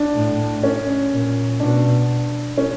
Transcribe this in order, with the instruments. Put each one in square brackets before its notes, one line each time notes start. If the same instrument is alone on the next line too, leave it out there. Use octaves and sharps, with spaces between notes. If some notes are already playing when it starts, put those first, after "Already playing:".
Already playing: [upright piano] D4
[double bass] A2
[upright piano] C#4
[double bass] A#2
[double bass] B2 [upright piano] D4
[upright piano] C#4